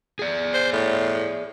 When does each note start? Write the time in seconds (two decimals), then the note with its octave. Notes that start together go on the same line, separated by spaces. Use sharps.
0.19 G#4 D5
0.54 C5
0.72 A2